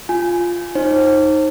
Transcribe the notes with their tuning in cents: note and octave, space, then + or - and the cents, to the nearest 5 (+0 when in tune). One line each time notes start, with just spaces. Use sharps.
F4 +0 G#5 +0
D#4 +0 C5 +35